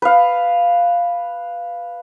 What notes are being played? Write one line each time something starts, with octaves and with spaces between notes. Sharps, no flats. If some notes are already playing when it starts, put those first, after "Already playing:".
B4 F5